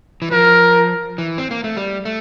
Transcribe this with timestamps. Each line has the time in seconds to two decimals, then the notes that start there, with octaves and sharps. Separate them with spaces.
0.22 E3
0.31 F3 A#4
1.18 E3
1.38 C4
1.51 A#3
1.64 A3
1.77 G3
2.05 A3